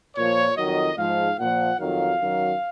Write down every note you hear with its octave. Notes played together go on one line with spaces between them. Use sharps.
A#2 F3 C#5
F2 D#3 F#3 D#5
G#2 F3 F5
A#2 F3 F#5
F2 D#3 F#3 F5
F#2 D#3 F#3